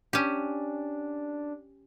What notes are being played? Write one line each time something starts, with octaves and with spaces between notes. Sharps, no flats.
C#4 D4 G4